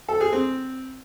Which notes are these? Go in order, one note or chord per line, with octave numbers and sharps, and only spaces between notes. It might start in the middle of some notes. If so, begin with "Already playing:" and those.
A4
G#4
C4